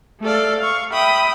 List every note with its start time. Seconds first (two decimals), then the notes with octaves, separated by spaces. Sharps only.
0.22 A3 A4 D5 F5
0.59 F5 C#6
0.92 E5 G5 B5 D#6